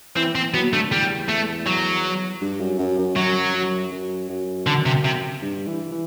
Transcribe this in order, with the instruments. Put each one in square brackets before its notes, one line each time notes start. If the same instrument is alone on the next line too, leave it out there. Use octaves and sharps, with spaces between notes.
[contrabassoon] E3 [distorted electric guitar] C4
[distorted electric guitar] C4
[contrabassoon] F#3 [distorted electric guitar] B3
[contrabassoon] D3 [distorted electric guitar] A3
[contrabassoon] E2 [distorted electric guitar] G3
[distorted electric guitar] A3
F#3
[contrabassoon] G2
F#2
F#2
F#2
[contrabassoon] F#2 [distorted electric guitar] F#3
[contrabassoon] F#2
F#2
F#2
[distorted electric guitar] D3
C3
C3
[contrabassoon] G2
E3
E3